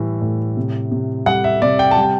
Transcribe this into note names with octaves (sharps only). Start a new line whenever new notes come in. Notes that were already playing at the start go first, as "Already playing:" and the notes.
Already playing: A2 E3 G3
A2
C3
C3
G3 F#5
E5
C3 D5
G5
G3 A5
G5